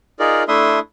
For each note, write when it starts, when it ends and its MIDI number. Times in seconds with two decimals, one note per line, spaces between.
0.20 0.43 63
0.20 0.43 65
0.20 0.43 68
0.20 0.43 70
0.20 0.43 74
0.48 0.79 57
0.48 0.79 62
0.48 0.79 64
0.48 0.79 76
0.48 0.79 84
0.48 0.79 87